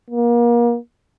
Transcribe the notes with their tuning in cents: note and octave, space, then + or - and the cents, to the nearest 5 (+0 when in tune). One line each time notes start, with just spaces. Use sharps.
A#3 +30